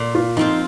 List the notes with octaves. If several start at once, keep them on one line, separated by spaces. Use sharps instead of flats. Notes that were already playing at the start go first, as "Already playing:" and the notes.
Already playing: A#2
F4
F3 C4 D#4 F4